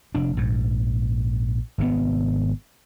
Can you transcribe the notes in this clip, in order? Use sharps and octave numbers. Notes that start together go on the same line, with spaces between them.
F1 D4
A#1 G#2
G#1 C3 B3